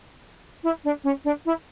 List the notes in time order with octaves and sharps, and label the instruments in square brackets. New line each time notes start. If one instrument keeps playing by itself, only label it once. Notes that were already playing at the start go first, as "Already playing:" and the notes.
[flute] E4
D4
C#4
D4
E4